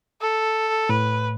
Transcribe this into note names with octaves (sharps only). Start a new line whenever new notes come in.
A4
A2 B4